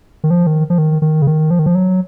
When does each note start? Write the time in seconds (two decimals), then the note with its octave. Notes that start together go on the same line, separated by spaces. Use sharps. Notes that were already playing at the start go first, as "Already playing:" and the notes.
0.24 D#3
0.31 F3
0.47 D#3
0.70 F3
0.78 D#3
1.02 D#3
1.22 C#3
1.27 D#3
1.51 F3
1.59 D#3
1.66 F3
1.75 F#3